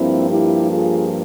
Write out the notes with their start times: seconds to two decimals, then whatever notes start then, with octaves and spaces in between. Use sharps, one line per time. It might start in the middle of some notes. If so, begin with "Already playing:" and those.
Already playing: G2 F3 A#3 C4 E4
0.31 E4 G4
0.72 F4 G#4